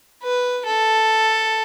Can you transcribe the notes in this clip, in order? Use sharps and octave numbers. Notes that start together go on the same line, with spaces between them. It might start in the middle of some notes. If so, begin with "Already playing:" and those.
B4
A4